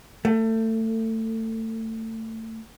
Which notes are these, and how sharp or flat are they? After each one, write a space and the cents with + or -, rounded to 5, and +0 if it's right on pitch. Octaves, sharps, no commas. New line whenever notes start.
A3 +25